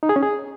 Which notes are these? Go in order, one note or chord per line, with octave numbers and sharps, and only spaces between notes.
D#4
G#4
C#4
G#4